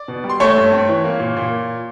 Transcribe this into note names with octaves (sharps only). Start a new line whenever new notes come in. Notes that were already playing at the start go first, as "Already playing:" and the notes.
Already playing: D5
B2
G3
C6
A3 C#5 C#6
G2
C4
E3
A#3
A#2
A#2